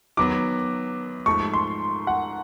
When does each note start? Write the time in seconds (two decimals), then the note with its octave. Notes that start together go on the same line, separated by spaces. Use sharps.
0.17 D#3 F#3 B3 D6
1.26 G#2 F3 A3 C#6
1.54 C6
2.07 F#5